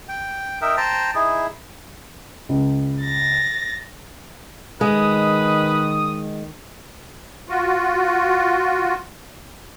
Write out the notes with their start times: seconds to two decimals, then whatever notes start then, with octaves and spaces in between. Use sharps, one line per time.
0.08 G5
0.62 D#4 A#4 E5 G5
0.77 C5 G5 A5 A#5
1.15 D#4 E4 G#4
2.49 C#2
3.03 A6 A#6
4.81 D#3 G#3 B4 D#6
7.49 F4 F#4